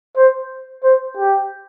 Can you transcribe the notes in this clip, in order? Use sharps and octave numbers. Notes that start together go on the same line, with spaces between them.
C5
C5
G4